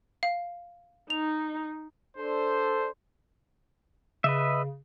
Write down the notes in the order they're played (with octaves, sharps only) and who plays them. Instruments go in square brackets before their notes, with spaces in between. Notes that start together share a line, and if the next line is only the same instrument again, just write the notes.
[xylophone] F5
[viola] D#4 [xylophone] F7
[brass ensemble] D4 A4 C5
[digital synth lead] C#3 [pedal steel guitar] B4 D#5 E5